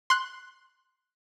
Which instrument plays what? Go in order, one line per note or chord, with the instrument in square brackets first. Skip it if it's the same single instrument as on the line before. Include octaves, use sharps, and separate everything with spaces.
[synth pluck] C6 F#6